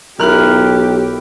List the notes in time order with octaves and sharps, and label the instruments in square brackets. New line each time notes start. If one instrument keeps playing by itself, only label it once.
[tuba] B1 [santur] E4 A#4 [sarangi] G4 [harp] F6 F#6